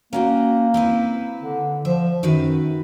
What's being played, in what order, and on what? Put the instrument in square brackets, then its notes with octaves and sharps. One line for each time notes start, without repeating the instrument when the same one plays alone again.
[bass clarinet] A#3 [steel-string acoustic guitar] C#4 F#4 G5
[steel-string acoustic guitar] C4 E4 B4
[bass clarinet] D3
[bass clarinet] F3 [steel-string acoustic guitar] E5
[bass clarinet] F#2 [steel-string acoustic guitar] D#3 F#4 B4